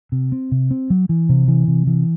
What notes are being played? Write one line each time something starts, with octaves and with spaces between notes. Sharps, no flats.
C3
C4
C3
C4
F#3
E3
C3
E3
C3
E3